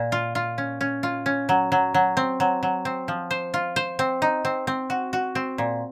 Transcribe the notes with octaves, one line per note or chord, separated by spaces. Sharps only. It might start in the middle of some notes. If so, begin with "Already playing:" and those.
Already playing: A#2
F4
F4
C#4
C#4
F4
C#4
F#3
F#3
F#3
C4
F#3
F#3
C4
F3
C5
F4
C5
C4
D#4
C4
C4
F#4
F#4
C4
A#2